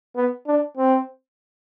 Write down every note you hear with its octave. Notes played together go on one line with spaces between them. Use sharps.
B3
D4
C4